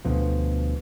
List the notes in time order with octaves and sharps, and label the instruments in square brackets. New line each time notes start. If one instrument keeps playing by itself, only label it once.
[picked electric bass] D2 B2 F3